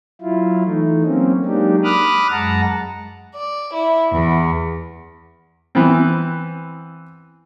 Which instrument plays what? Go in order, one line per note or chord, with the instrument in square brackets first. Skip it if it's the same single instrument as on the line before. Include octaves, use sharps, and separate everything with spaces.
[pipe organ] F#3 E4 F4
E3 A3 D#4
F#3 A#3 C4 C#4
F#3 G#3 A#3 D4 D#4 G4
B5 D6 D#6 F6 F#6
F#2 G#3 F#5 A5 A#5
[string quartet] D5
E4
E2
[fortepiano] E3 B3 C4